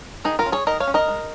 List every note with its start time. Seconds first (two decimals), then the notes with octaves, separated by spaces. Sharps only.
0.24 D#3 D#4 G#4
0.39 F4 A#4
0.46 C#4
0.52 G#4 C#5
0.67 D#3 A#4 D#5
0.80 C#5 F5
0.87 C#4
0.94 A#4 D#5
1.08 G#3